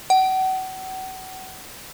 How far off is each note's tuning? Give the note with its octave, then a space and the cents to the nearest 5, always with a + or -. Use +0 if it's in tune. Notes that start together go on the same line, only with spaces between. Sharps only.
F#5 +35